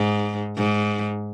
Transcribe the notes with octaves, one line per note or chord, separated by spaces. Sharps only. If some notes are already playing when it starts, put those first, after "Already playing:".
Already playing: G#2
G#2